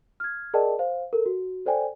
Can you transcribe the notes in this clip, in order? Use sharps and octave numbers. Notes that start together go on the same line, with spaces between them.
F6 G#6
G#4 A#4 D5 D#5 G5 A5
C5 F5
A4 A#4
F#4
A4 C5 D5 G5 G#5